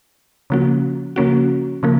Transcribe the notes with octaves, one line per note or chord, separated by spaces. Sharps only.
C#3 F3 A#3 C#4 F#4
C#3 F3 A#3 C#4 F#4
C#3 F3 A#3